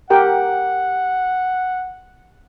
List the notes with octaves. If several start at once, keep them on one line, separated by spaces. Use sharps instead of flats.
G4 A#4 F#5 G5